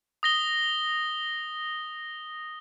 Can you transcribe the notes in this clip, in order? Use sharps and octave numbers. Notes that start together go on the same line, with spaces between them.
D#6 A#6 G7